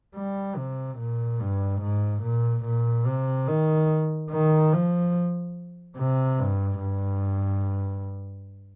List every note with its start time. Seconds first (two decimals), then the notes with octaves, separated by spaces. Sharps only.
0.15 G3
0.56 C3
0.98 A#2
1.40 G2
1.81 G#2
2.23 A#2
2.65 A#2
3.06 C3
3.48 D#3
4.31 D#3
4.73 F3
5.97 C3
6.39 G2
6.80 G2